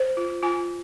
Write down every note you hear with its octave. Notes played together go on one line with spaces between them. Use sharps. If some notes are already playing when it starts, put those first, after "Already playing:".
Already playing: C5
F4
F4 G#5